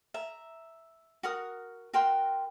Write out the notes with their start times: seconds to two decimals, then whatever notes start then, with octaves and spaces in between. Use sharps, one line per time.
0.14 E5 A#5
1.23 F#4 A#4 D#6
1.93 F#4 A#4 G5 C6